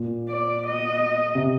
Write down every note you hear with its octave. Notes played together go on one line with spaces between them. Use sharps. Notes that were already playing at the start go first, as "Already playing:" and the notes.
Already playing: A#2
D5
D#5
C3